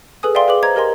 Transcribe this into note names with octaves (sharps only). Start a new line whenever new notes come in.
G#4 A4 B4 G#5 D#6
D5 E5 F5 G5 G#5 C6
G#4 B4 D6 F#7
C5 D#5 A#5 G#6
G4 A#4 D#5 G#5 C6